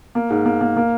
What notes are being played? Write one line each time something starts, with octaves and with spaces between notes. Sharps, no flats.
A#3
G#2
A#3
A#3
A#3